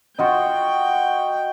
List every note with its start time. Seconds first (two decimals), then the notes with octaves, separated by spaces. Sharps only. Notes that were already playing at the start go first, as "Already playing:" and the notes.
0.19 F4 F#4 D#5 G5